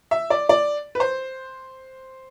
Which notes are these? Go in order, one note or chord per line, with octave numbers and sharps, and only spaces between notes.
E5
D5
D5
B4
C5